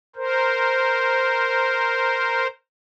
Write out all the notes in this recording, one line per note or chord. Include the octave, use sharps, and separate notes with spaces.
A#4 C5